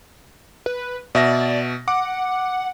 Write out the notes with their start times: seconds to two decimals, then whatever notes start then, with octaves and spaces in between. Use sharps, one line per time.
0.66 B4
1.15 B2 D5 E5 A#6
1.88 F#5 D6